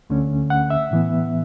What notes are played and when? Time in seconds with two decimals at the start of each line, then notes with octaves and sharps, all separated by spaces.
0.10 D2 D3 A3 C#4
0.50 F#5
0.70 E5
0.91 A2 E3 B3